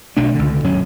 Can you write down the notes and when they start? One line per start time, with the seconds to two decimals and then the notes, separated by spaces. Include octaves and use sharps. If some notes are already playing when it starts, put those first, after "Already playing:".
0.17 B1 B2 A3 D4
0.35 C#2 D3
0.64 D#1 F#2 F#3 C#4